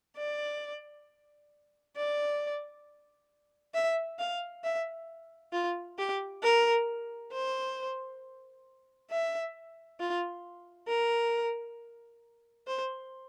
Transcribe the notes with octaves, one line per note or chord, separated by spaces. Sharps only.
D5
D5
E5
F5
E5
F4
G4
A#4
C5
E5
F4
A#4
C5